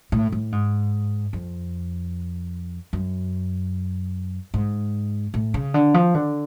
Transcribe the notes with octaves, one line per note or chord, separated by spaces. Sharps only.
A2
A2
G#2
F2
F#2
G#2
A2
C#3
D3
F3
D3